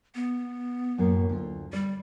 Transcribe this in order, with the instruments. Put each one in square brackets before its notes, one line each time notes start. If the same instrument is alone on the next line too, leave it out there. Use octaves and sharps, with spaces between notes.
[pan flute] B3
[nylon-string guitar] F#2 A2 A#3
D2 F4
[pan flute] G3 [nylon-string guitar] D5